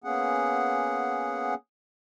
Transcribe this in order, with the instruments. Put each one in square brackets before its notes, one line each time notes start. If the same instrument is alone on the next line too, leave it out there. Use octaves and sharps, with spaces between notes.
[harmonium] A#3 B3 C#4 G#4 F#5